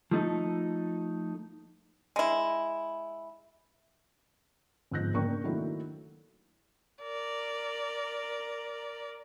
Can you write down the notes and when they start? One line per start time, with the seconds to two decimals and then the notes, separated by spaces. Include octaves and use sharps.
0.11 F3 A3 D#4 A4
2.16 G#3 E4
4.91 G1 G#2 F3 F#6 G6 A#6
5.14 F#1 A#3 D4 G5 C#6
5.44 D#3 F#3 A3 A#3 D4 E4
7.03 A#4 D5